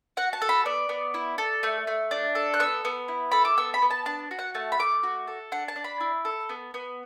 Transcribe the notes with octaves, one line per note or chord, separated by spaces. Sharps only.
F#4 F#5
A5
A4
B5
B3 D5
B3
E4
A4
A3
A3
D4
A4
F#6
B3 E6
B3
E4
A4 B5
D6
B3 E6
B5
B3
A5
D4 A5
F#4
F#5
A3 A5
B5
A3 D6
F#4
A4
D4 F#5
A5
D4
B5
E4
A4
B3
B3